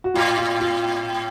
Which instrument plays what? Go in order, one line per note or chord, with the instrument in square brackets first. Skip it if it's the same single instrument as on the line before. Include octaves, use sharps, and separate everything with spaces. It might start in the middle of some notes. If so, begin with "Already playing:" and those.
[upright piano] F#4
[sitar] A2 [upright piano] F4
[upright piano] F4
F4